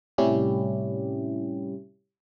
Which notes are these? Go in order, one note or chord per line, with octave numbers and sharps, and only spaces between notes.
A2 C3 G3 C#4 E4 G4